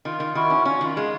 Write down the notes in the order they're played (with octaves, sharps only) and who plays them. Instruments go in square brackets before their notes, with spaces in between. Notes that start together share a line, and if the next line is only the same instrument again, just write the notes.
[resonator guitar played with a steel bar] D#3 [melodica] F4
[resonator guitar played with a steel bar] D#3
[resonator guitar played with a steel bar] D#3 [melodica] E4 F#4
[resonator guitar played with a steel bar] C#4
[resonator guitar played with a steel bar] C#4 [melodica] F4
[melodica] F#4
[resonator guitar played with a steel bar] D#3 [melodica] F4
[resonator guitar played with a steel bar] G#3 [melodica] F4